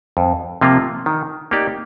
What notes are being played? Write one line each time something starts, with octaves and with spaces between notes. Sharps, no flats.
F2
C3 F3 A#3 F4
D#3
A#3 D#4 G4 D5